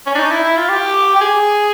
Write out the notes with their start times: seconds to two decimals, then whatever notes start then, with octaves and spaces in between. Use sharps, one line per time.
0.06 C#4
0.15 D4
0.18 D#4
0.31 E4
0.44 E4
0.57 F4
0.70 G4
1.16 G4
1.21 G#4